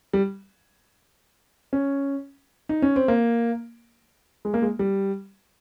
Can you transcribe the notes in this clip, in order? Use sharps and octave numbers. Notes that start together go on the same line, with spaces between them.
G3
C#4
D#4
C#4
C4
A#3
G#3
A#3
G#3
G3